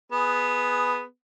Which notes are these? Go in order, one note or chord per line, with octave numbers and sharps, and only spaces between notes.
B3 G#4